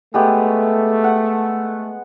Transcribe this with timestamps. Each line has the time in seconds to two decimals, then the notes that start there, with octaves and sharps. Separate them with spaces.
0.14 G#3 A3 B3 G4
1.04 F#5